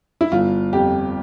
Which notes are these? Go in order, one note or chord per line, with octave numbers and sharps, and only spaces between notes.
E4
G1 F4
F2 G4